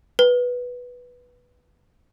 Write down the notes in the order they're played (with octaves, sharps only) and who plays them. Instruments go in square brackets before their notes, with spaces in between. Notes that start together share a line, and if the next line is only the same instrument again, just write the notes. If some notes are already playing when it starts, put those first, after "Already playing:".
[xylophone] B4